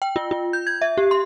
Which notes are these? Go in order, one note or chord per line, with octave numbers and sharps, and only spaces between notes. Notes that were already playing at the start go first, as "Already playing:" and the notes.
G5
F4
F4
G6
G#6
E5
G4
C6